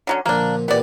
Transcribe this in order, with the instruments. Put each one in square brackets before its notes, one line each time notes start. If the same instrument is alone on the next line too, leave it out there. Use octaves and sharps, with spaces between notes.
[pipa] D3 F#3 C#4
[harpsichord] A#2 D3 F3 [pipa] A#3 D4
[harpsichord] A#2 E3 G3 [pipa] B3 D5